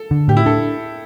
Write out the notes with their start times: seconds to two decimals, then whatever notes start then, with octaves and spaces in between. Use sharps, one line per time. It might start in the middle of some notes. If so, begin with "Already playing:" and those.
Already playing: A4
0.11 D3
0.28 A2 G4
0.37 E4
0.46 D4 A4